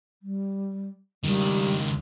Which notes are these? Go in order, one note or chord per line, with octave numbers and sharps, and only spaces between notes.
G3
C#2 D#3 G3